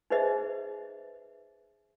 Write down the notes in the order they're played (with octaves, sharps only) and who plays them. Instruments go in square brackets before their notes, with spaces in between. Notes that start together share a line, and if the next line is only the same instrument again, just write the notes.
[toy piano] D#4 G#4 B4 C5 D#5 E5